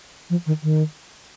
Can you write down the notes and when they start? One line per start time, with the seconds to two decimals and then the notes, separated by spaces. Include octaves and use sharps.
0.30 F3
0.46 D#3
0.63 D#3